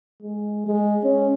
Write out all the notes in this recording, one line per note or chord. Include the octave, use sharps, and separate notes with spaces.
G#3
G#3
C#4